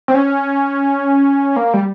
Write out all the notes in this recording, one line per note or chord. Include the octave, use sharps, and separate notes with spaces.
C4
C#4
A#3
G3